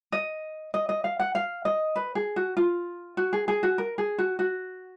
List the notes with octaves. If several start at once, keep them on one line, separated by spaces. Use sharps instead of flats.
D#5
D#5
D#5
F5
F#5
F5
D#5
B4
G#4
F#4
F4
F#4
G#4
G#4
F#4
A#4
G#4
F#4
F#4